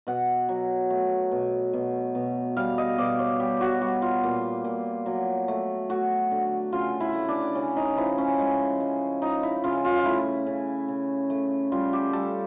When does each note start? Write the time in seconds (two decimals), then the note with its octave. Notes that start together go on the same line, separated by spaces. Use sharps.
0.07 B2 F#5
0.49 F#3
0.90 A3
1.32 B2
1.73 B2
2.15 B2
2.57 G3 F5
2.78 D#5
2.98 B2 D5
3.19 C#5
3.40 G3 G4
3.61 F#4
3.81 G3 F#4
4.02 F4
4.23 A#2
4.64 A#2
5.06 F#3
5.48 A3
5.90 A3 F#4
6.31 D3
6.73 C#3 F4
7.00 E4
7.14 A3
7.28 D4
7.55 C#3 C#4
7.77 D#4
7.97 F3 E4
8.18 C#4
8.39 G#3
8.80 G#3
9.22 F3 D#4
9.43 E4
9.64 C#3 F4
9.85 F4
10.05 A3 E4
10.46 C#3
10.88 C#3
11.30 A3
11.72 G3 F4
11.93 G4
12.13 G3 A4